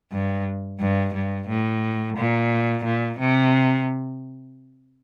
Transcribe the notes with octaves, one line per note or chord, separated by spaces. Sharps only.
G2
G2
G2
A2
A#2
A#2
C3